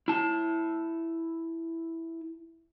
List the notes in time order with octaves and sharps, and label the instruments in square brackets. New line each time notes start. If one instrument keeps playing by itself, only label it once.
[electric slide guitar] E4 A5